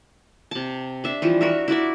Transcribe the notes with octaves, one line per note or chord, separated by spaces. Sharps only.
C3 A5
D4 E5
E3 F3 G3
F#4 A#4 E5
E4 F#4 D5 E5